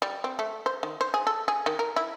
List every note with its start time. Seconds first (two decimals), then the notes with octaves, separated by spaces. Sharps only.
0.02 G3
0.24 C4
0.39 A3
0.66 C5
0.83 D#3
1.01 C5
1.14 G#4
1.27 A4
1.48 G#4
1.66 D#3
1.79 A#4
1.96 E4